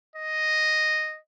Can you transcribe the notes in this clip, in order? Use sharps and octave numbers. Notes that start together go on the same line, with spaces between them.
D#5